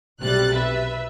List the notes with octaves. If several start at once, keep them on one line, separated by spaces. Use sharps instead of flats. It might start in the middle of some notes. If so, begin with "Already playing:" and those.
B1 C3 G3 F#6 A6
B4 E5